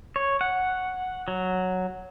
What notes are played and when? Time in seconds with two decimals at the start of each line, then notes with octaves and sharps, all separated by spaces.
0.16 C#5
0.41 F#5
1.28 F#3